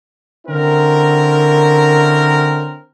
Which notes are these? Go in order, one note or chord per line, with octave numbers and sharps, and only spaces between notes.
D3 C4 C#4 E4 A#4